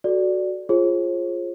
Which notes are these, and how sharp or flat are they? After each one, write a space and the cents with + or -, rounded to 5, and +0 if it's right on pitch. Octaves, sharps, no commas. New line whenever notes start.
F#4 +0 A4 -20 D5 +0
F4 +0 G#4 +0 C5 +45